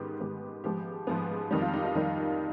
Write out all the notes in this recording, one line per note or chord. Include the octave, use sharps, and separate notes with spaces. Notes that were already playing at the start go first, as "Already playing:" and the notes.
Already playing: G#2 D#3 B3 G4
G#2 D#3 B3 G4
G#2 F3 G#3 B3 G4
G#2 F3 G#3 B3
F2 D#3 G3 G4
F4
D#4
F4
F2 D#3 G3